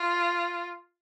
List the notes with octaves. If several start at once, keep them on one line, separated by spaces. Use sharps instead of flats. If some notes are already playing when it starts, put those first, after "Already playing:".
Already playing: F4